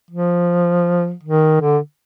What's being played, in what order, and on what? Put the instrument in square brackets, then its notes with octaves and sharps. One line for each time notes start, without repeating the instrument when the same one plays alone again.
[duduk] F3
D#3
D3